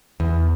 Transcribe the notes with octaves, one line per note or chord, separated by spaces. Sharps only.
E2